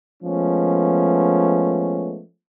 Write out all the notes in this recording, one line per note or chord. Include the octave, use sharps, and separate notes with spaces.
F3 G#3 A3 B3 C#4